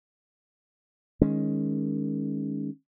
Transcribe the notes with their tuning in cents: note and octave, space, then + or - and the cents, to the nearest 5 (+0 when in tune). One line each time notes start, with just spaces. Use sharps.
D#3 +0 G#3 +0 C#4 +0